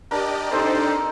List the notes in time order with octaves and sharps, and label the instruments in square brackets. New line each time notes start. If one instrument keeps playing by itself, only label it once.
[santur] D4 A#4 [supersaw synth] G4 D5 D#5
[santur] C4 D#4 [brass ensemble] D4 A4 C5